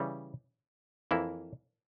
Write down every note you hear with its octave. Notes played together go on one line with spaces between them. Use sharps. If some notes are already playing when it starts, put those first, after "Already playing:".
Already playing: C#3 E3 G3
F2 E3 A#3 E4